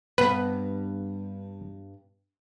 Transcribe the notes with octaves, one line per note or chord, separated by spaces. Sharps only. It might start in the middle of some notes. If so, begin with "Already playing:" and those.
G2 B3 B4